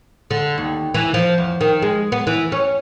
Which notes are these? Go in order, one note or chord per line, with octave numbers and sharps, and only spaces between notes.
D3
D#2
E3
F3
E2
D#3
G#3
B3
E3
C#4